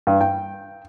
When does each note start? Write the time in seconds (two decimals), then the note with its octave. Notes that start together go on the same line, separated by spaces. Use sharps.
0.07 G2
0.21 G5